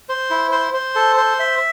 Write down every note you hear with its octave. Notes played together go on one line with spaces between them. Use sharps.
C5
E4
C5
C5
A4
C5
E5